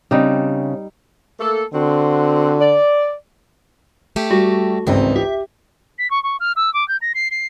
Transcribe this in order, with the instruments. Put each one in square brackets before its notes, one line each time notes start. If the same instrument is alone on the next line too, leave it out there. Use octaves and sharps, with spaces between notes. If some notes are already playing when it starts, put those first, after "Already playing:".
[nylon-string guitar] C#3 C4 D4 [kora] G3 D#4
[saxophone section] A3 A#3 A4
[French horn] D3 [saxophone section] C4 F#4
[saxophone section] D5
[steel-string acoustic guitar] A3 G4
[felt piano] G3 [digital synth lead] F#4
[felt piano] G#1 C#2 C4 [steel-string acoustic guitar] E3 D#4
[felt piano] G4 [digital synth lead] E5
[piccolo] B6
C#6
C#6
F6
E6
D6
G6
A#6
C7
C7